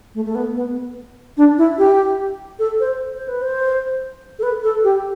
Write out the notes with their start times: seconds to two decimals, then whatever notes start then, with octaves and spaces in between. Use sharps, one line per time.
0.15 A3
0.25 A3
0.35 B3
0.55 B3
1.37 D4
1.58 E4
1.78 G4
2.59 A4
2.80 C5
3.14 C5
3.28 B4
3.42 C5
4.39 A4
4.43 B4
4.63 A4
4.84 G4